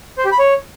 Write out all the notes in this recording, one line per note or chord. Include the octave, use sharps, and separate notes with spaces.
C5
G4
B5
C#5